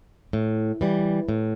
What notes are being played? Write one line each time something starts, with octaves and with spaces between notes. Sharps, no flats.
A2
E3 G3
A2